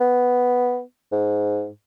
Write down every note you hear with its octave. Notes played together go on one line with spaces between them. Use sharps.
B3
G#2